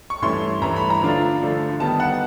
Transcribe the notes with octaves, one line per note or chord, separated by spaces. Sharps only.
C#6
G2 E3 A3 C#4 E4 C6
G2 E3 A3 C#4 E4 A#5
B5
A#5
D3 F3 A3 D4 F4
D3 F3 A3 D4 F4
D#3 G3 B3 D#4 A5
F#5